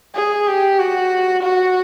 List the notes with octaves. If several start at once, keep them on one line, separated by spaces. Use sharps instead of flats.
G#4
G4
F#4
F#4